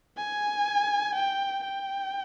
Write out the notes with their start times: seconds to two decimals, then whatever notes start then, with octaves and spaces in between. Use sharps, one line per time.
0.17 G#5
1.15 G5
1.64 G5